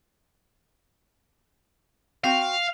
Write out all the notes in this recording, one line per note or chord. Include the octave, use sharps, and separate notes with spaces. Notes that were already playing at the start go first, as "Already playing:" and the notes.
C4 F#4 F5 G5